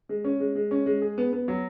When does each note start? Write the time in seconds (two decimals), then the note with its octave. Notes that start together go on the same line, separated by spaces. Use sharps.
0.09 G#3
0.24 C#4
0.40 G#3
0.55 G#3
0.71 C#4
0.86 G#3
1.02 G#4
1.18 B3
1.33 B3
1.48 F#3